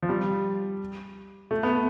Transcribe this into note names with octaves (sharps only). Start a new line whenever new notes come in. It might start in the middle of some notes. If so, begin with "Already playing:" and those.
F3
G3
A3
B3